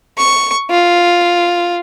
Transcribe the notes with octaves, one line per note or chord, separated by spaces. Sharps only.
C#6
F4